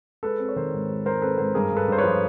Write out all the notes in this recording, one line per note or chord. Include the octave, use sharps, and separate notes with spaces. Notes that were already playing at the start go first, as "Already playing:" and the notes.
G#3 A4 B4
C4
C#5
D#3 A#4 C5
G#2
G#3
G#2 A#4 C5
C4 A4 B4
G#2 A#4 C5
G2 G#4 A#4
G2
A4 B4
G2 C5
B4 C#5
F3